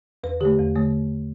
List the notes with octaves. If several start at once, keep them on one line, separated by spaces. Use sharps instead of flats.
E2 B4
D3 A3 G4
E2
D3 A3